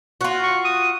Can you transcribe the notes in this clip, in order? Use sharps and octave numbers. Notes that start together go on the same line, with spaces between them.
F4 F#4
C#6
D#6